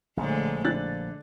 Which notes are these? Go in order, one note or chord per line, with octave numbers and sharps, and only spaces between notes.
A#1 A2 D3 G#3
D3 D4 F#6 A6